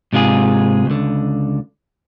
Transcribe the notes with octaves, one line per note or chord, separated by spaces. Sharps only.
G#2 C3 G#3 F4 G#4
C#2 D3